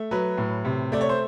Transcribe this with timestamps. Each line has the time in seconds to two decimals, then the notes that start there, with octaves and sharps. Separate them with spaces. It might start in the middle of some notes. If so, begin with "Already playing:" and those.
Already playing: A3
0.11 F#3 B4
0.38 A2
0.65 C3
0.92 A3 D5
1.01 C#5
1.09 C5